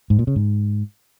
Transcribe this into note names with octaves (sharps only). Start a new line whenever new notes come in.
G#2
A#2
C#3
G#2